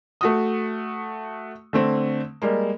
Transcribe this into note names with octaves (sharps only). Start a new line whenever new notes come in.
A3 F#4 D#6
D3 A3 C4
G3 G#3 A#3